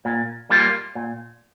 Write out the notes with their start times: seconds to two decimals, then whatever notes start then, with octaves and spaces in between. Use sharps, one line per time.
0.05 A#2
0.50 G3 A#3 F4
0.95 A#2